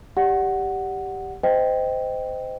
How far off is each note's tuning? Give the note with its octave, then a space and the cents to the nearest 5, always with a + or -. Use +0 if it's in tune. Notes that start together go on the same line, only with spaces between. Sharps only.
G4 +0 D5 +0 F#5 +0
C5 -25 D#5 +0 G5 +0